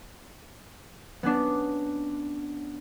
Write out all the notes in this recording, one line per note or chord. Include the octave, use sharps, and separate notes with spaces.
B3 C#4 D4